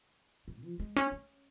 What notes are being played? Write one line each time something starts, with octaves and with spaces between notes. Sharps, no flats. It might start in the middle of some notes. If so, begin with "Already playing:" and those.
G#2
F3
G#3
C#4
C#4